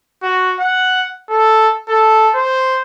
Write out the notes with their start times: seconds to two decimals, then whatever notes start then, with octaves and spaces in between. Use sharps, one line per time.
0.23 F#4
0.60 F#5
1.30 A4
1.89 A4
2.35 C5